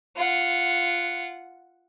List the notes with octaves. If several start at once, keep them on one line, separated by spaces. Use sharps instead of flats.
F4 F#5